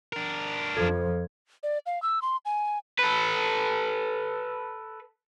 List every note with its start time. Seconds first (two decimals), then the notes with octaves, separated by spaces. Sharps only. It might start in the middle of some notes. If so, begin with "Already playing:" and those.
0.13 D4 A#4
0.77 F2 F3 A4 G#6
1.63 D5
1.86 F5
2.02 E6
2.22 C6
2.45 G#5
2.99 A4 B4